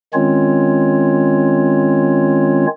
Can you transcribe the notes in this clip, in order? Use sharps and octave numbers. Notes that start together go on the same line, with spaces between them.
D#3 G#3 C4 C#4 F4 C#5